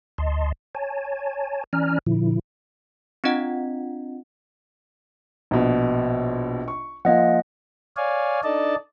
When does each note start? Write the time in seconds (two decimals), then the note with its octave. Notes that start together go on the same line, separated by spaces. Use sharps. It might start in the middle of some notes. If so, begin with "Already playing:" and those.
0.18 D2 D#5 A5 C6
0.75 C#5 G#5 A5
1.73 E3 C#4 D5 G#5 A#5 F6
2.07 A#2 D3 F3 E4
3.24 C4 D4 F4 D#5 F#5
5.51 A#1 B2
6.68 C#6
7.05 F3 A#3 D#5 F#5
7.97 C#5 D5 F5 G#5
8.44 D4 D#4 A4 D5 D#5 A5